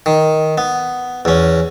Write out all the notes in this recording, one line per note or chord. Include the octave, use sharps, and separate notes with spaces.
D#3
B3
E2 C#4